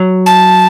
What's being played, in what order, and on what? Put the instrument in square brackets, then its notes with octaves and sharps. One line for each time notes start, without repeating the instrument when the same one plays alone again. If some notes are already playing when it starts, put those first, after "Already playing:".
Already playing: [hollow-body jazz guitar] F#3
[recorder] A5